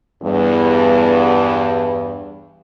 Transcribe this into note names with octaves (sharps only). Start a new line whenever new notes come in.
E2 G2